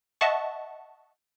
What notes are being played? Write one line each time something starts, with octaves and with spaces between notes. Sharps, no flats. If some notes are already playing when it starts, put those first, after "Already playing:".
D#5 E5 F#5 A5 C#6